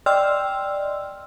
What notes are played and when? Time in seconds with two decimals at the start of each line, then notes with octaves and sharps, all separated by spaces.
0.06 D5 D#5 G5 C6 E6 F6